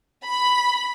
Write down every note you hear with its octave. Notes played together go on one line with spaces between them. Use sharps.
B5